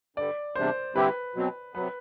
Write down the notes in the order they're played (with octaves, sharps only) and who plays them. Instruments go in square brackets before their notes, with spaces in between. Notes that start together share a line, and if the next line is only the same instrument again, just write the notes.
[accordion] G2 D3 G3 [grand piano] D5
[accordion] E2 C3 G3 D4 [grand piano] C5
[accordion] D3 G3 C4 E4 G4 [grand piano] B4
[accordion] B2 F#3 C4
[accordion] C3 F#3 B3 [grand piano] B4